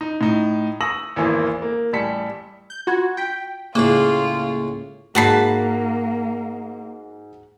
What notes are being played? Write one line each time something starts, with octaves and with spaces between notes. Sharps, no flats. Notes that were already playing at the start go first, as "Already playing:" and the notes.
D#4
A2 D#4
C#6 D#6 E6 A#6 F#7
G#1 E2 E3 A#3 E6
A#3
A1 G3 A5 B6 C#7
G6
F4 F#4 C6 G#6
G5 G6 B6
C#2 A2 C#3 A#3 F4 G#4
G#2 A#3 F#4 A5 B5 B6 C7